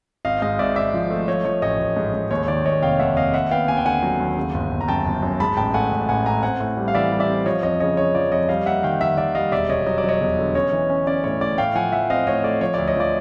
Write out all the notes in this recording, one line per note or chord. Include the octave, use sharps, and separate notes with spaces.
G#1 D#5 F5
G#2 D#5 F5
G#1 D5 E5
G#1 D5 E5
F3
A3
F3 C#5 D#5
F3 C#5
A1 C#5 D#5
A1
G#2
G#2
D#2 C#5
D#3 D5
D#2 C#5 D#5
F1 F5 G5
D#2 E5 F#5
F1 D#5 F5
D#2 E5 F#5
B3 F5 G5
D#2 G#5
G5
D3 F#5 G#5
F#3
D#2
C#3
G1
G1
A#5
F#2 G5 A5
G1
F#2
G#2 A5 B5
A1 G5 A5
A3 F#5 G#5
A1
A1 F#5 G#5
A3 G#5 A#5
C4 F#5 G#5
A2
G3
F5
E3 D5 E5
G3
D5 E5
C4
F3 C#5 D#5
F2 C#5 D#5
C#3 C#5 D#5
C#3 C#5
F3 D5
F2 C#5 D#5
G3 D#5 F5
A#3 E5 F#5
D#3 F5 G5
D#3 E5 F#5
D#3 D5 E5
G3 D#5 F5
E1 D5 E5
E1 C#5 D#5
F#3 D#5
D5
F#3 C#5 D#5
E1
D3
C#4 C#5 D#5
E3
C#4
C#4 D5
A2 C#5
A2 D5
A2 F5 G5
F3 F#5 G#5
F3 E5 F#5
C4 D#5 F5
A2 C#5 D#5
A3 D5
F3 C#5
D2 D5
C#5 D#5
F3 D5